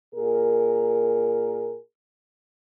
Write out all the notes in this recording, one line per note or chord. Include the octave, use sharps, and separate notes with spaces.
A#2 G#4 A#4